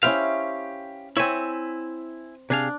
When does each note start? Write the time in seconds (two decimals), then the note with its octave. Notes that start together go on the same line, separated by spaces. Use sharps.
0.03 C#4 E4 G4 C5 F5
1.17 C4 E4 C#5 E5 G#5
2.50 C3 D4 G#4 F5